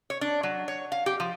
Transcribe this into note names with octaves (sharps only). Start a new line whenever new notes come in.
C#5
D4
F#3
C#5
F5
G4
F3